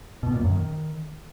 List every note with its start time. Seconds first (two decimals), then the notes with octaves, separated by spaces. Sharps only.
0.23 B2
0.32 A#2
0.41 F#2
0.50 D#3